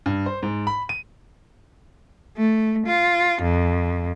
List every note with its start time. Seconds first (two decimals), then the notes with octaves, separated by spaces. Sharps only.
0.06 G2
0.26 C5
0.43 G#2
0.67 B5
0.89 D#7
2.37 A3
2.87 F4
3.42 F2